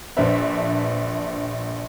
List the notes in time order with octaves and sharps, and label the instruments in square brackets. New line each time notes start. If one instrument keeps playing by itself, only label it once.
[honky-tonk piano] A#1 D4 B4 C5 E5